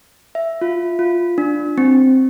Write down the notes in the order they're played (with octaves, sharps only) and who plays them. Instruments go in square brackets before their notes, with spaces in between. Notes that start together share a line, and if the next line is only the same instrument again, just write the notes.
[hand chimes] E5
F4
F4
D4
C4